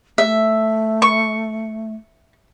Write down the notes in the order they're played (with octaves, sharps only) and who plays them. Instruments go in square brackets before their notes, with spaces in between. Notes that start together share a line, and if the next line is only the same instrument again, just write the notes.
[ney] A3 [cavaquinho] E5
[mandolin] C#6